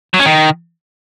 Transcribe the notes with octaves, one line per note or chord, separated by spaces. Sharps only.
F#3
C#4
D#3